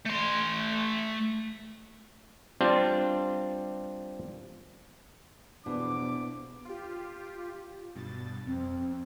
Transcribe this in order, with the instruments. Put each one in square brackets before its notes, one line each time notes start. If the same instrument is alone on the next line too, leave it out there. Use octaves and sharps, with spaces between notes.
[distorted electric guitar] A3 C6
[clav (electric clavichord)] G3 C4 D4 F4
[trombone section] E2 F3 D4 [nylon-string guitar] B2 [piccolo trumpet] D6
[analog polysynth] F4 G4
G2 B2 A6
[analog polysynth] F2 [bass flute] C4